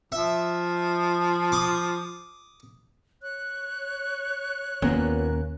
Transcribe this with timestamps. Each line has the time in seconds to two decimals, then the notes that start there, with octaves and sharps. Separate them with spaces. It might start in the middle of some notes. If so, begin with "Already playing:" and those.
0.12 F3 E5
1.52 D6 D#6
3.22 C#5 C#6 F#6
4.82 D#2 A#2 A#3 B3 C#4